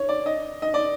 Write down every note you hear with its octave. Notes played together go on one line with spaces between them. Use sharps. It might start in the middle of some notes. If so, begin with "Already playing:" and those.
Already playing: C#5
D5
D#5
D#5
D5